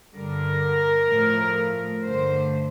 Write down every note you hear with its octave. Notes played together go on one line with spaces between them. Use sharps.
G2 D3 G3 A#4
A2 F3 A3
G2 D3 A3 C5